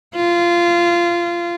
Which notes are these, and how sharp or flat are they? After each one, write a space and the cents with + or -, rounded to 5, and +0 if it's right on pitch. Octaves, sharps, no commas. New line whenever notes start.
F4 -20